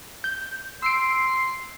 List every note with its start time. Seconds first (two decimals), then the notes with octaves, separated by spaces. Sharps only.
0.24 G6
0.83 C6 E6 C7 D7